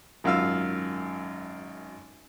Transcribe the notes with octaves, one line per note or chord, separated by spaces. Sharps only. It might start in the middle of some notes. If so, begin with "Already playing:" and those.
G#1 F#2 F4 F5 E6